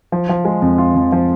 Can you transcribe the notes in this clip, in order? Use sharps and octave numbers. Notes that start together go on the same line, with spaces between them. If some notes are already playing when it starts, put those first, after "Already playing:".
F3
F3
G#3
F2
F4
F2
F3